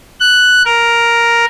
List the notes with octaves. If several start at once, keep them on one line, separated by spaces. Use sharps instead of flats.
F#6
A#4